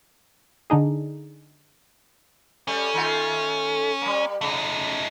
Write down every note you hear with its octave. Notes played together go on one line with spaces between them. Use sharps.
D3 D4 D#4 G#4
G3 A3 C#4
D#3 A3 F4
G3 A#3
C#3 A3 D#4